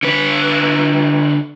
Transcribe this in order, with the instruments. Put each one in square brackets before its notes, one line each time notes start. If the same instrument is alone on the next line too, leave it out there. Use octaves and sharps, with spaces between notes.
[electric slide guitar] D3 B4